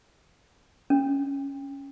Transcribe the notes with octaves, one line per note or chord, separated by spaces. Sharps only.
C#4